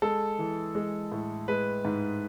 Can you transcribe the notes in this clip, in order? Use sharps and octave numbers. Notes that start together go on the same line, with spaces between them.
G#3 A4
E3
G#3
A2
G#3 B4
G#2